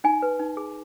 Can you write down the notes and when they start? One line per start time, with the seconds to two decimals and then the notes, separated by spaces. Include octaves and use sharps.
0.04 D#4 G#5
0.22 B4
0.39 D#4
0.57 G#4